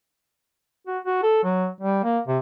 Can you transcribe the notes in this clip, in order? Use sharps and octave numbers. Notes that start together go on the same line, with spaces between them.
F#4
F#4
A4
F#3
G3
A#3
C3